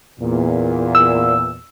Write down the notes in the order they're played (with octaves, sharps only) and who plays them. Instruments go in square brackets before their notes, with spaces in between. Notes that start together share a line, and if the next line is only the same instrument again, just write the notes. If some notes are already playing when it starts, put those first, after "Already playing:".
[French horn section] E2 A#2
[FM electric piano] E6